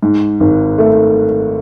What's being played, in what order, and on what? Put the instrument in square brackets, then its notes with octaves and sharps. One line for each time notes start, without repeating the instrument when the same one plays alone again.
[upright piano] G#2
G#1
A3